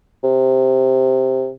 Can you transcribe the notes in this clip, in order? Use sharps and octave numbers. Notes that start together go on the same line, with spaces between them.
C3